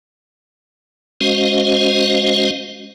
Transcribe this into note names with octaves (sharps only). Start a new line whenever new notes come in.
G#3 C#4 F#4 C5 D#5 F5